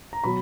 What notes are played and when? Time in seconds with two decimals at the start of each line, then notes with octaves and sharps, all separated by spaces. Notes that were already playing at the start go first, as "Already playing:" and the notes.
0.13 A#5
0.24 B2 F#3 B5